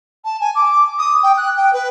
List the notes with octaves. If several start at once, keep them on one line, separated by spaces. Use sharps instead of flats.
A5
G#5
D6
D#6
G5
F#6
G5
B4